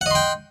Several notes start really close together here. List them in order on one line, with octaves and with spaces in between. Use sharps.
F#5 D#5 C6 G5